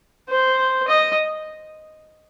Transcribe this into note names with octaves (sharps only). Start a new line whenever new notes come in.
C5
D#5